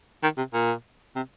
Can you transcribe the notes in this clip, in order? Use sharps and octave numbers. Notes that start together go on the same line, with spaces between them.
D#3
C3
A#2
C3